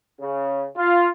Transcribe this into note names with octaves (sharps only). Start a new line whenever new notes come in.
C#3
F4